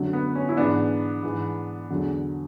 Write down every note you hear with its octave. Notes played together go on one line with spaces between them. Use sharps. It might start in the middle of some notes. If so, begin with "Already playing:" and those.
Already playing: F#2 D3 F#3
B3
C#4
E4
G#2 E3 B3 D4
G#2 E3
E2 D3 F#3